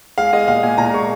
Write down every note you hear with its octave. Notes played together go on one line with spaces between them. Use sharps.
G#3 F5
G#3 D#5
A#2 F5
A#2 G#5
A#2 A#5
G#3 C#6